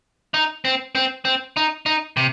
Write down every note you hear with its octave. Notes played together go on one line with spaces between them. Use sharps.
D#4
C4
C4
C4
D#4
D#4
C3